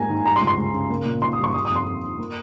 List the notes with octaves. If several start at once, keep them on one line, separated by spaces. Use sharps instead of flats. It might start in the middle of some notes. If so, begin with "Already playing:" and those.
Already playing: G#2 G3 A#3 G#5 A#5
D#3
G3 A#5
C6
C#2
C6
C#2
C#3
A#3
A#2
A#2 C6
D#6
G3
C#6
G3 D#6
D#6
F2
C6
F2
D#3
A#3